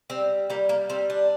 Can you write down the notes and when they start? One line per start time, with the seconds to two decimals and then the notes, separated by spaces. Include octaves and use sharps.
0.10 G3 C4
0.50 G3 A#3
0.69 A#3
0.90 G3 C4
1.10 D4